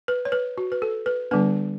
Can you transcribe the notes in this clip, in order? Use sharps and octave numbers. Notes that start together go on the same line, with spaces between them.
B4
C#5
B4
F#4
B4
A4
B4
D3 G3 B3 D4 B4